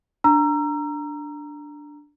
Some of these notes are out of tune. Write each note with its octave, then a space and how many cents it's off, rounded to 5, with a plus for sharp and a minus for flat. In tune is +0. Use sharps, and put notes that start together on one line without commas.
D4 +0 A#5 +0 E6 +35